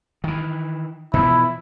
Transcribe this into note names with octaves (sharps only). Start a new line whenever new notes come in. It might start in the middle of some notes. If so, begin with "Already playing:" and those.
D#3 E3
B2 E3 F3 E4